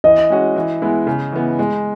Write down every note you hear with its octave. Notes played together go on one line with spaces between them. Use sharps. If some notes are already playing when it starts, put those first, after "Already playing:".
E3 D#5
G#3 C#4 F#4
E3
G#3 B3 E4
C#3
E3 B3
G#3